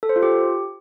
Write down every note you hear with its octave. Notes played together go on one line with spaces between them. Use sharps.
A4
C5
F4
G4